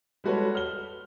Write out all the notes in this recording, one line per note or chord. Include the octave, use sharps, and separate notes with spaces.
G3 G#3 F#4 A4 B4 C#5
F6 G7